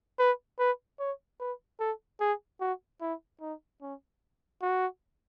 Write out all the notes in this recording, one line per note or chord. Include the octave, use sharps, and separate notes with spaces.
B4
B4
C#5
B4
A4
G#4
F#4
E4
D#4
C#4
F#4